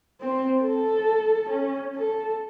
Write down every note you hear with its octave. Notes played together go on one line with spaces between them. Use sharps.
C4
A4
C#4
A4